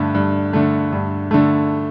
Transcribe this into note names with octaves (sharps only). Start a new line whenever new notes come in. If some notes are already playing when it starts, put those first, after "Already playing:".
Already playing: G2 D3 A3
G2
D3 A3
G2
D3 A3